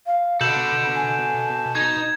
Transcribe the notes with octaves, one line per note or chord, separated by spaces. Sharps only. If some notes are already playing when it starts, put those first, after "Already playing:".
F5
B2 A4 F#5 B5 G6 E7 F#7
G#5
D#4 G#6